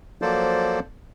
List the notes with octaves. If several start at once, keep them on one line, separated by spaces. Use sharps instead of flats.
F3 F#3 A#3 A4 C5 D5